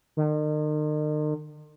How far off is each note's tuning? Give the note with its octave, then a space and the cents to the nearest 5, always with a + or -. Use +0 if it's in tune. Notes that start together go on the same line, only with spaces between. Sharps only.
D#3 -40